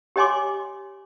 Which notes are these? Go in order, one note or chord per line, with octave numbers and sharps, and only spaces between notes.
G4 C#5 D#5 G#5 C6 D6